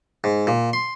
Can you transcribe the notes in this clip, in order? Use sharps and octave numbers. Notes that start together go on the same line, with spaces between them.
G#2
A#2
C6